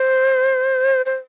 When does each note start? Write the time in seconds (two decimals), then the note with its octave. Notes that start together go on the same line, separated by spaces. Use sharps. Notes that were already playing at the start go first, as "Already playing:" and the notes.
Already playing: C5
1.06 C5